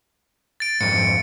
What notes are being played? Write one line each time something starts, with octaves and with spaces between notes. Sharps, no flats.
A6 D7
F2 G#2 C#7